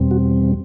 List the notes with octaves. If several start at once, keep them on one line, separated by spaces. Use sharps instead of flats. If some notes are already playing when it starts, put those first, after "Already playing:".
Already playing: E2 B2 G3 C4
F#4